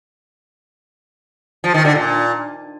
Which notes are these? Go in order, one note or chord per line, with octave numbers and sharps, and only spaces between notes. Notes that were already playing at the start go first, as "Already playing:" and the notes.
F3
D#3
D3
A#2